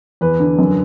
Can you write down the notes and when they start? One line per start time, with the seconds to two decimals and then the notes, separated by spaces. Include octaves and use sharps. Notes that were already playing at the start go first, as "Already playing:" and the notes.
0.21 E2 B4
0.40 D3
0.59 F#2